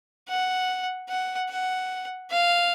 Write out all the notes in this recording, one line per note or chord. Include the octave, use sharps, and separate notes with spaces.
F#5
F#5
F#5
F5